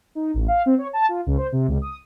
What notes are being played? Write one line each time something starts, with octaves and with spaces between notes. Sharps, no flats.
D#4
A1
F5
C4
C#5
A5
F4
C#2
C5
C3
C#2
D#6